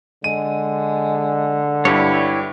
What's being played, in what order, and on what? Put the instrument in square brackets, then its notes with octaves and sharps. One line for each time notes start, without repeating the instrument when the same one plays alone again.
[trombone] D3 [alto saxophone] G#3 [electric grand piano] D#7
[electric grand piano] G2 [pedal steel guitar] E4 G4 C#5